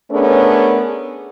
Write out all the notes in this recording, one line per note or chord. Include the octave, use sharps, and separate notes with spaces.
A3 B3 C#4 D4 G#4 A#4